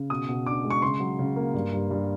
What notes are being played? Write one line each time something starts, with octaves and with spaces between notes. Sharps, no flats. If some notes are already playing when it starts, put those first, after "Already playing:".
Already playing: C#3
B2 D#6
B2
D4 D6
G#3
C#6
C#3 C6
F#3
C#3
A#3
G2
G2
G2